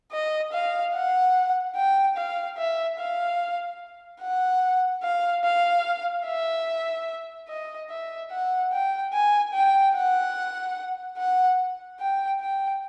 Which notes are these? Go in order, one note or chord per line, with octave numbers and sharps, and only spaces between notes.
D#5
F5
F#5
G5
F5
E5
F5
F#5
F5
F5
E5
D#5
E5
F#5
G5
G#5
G5
F#5
F#5
G5
G5